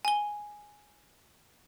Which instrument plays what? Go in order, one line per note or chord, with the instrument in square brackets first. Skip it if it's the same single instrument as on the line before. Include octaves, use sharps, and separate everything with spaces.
[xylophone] G#5 G7